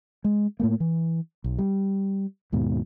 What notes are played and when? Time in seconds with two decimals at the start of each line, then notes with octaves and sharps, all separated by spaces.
0.24 G#3
0.60 A2 A3 A#3
0.80 E3
1.44 B1
1.58 G3
2.52 D#2 G#2 B2